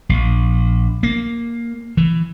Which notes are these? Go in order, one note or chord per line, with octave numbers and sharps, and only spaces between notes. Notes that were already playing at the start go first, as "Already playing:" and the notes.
A#1
A#3
E3